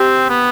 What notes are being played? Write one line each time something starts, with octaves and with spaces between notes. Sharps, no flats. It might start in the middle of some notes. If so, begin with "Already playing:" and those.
Already playing: C4 G4
B3